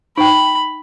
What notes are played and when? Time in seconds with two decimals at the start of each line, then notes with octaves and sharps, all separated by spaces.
0.18 D#4 G5 B5